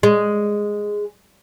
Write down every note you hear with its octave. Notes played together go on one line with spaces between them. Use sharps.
G#3